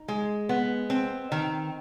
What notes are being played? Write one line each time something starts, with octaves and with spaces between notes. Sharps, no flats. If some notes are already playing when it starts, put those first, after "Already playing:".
Already playing: D#4
G#3
B3
C4
D#3